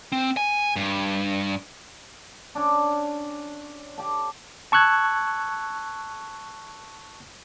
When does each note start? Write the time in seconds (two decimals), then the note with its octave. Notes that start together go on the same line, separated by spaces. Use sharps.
0.12 C4
0.37 G#5
0.76 G2
2.55 C#4 D4
3.98 G4 A5
4.72 A5 C#6 E6 F#6 G#6